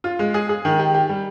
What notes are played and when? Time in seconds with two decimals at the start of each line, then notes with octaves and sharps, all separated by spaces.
0.04 F4
0.19 G#3
0.34 G#4
0.49 G#4
0.65 D#3
0.79 G4
0.94 G4
1.09 G3